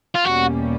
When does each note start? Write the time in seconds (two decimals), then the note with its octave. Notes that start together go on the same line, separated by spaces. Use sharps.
0.15 F4
0.25 E2 B2 G3 A#3 C#4 F#4